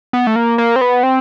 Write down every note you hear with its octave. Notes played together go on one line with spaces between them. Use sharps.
B3
A3
A#3
A#3
C4
B3
C4